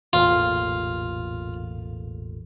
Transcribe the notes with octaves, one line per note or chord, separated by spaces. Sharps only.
E1 A1 A#2 F4